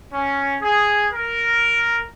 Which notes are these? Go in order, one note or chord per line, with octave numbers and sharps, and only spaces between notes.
C#4
G#4
A#4